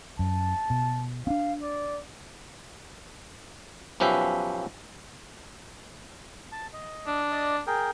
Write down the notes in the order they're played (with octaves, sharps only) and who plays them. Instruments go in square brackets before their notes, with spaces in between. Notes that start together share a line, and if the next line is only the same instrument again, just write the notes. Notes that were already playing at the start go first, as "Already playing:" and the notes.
[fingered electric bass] F#2 [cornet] A5
[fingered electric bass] B2
[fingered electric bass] C4 D4 [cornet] F5
[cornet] D5
[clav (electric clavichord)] B1 F3 C#4 G4 B4 E5
[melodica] A5
D#5
[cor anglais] D4
[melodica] D5 D#5 D#6
G#4 A#4 G5